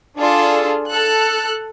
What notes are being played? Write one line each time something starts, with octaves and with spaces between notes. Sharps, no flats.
D4 F4 G#4 A4
A4 F#6